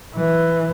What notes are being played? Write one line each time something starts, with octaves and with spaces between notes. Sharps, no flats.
E3